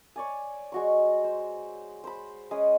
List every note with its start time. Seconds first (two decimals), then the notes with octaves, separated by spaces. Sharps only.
0.16 C#5 D5 G#5
0.72 G#3 F#4 C#6
1.24 C5
2.04 C5 B5
2.51 G#3 C#4 D#6